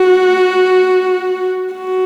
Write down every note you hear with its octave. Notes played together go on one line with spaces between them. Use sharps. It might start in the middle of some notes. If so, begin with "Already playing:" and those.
Already playing: F#4
F#4